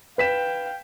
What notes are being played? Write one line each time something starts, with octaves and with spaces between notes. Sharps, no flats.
B4 F5 G5 B6 E7